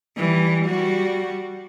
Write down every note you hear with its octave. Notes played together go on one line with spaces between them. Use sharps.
E3 G3
G3 F#4